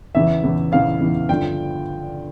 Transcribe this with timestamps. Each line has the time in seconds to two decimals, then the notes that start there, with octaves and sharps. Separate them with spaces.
0.15 E2 C#3 E3 E5
0.43 E2 C#3 E3
0.72 E2 C#3 E3 F5
1.01 E2 C#3 E3
1.29 G2 D3 F3 G5